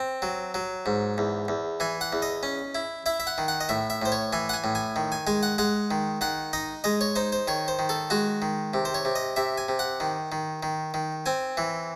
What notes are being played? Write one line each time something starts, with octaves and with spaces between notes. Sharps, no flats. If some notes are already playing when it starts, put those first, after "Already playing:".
Already playing: C4
F#3
F#3
G#2
E2
E2
E3 G#5
F#5
E2
D#5
C#4
E4
E4 E5
E5
F#5
D#3
F#5
D#5
A2 E5
E5
A2 C5
C#5
E3 G#5
F#5
G#5
A2
G#5
D#3
G#5
G#3 G#5
F#5
G#3 F#5
D#3
D#3 F#5
D#4 D#5
G#3 D#5
C#5
D#4 C5
C5
D#3 C#5
C5
D#3
A4
G#3 F#4
D#3
C3
C5
C#5
C3
D#5
C3 E5
G#5
C3
F#5
D#3
D#3
D#3
D#3
C4 G#5
E3